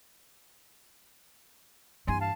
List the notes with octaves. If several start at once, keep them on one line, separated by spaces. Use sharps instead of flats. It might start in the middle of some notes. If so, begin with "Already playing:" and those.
G2 E3 G#5 C6
F5 A5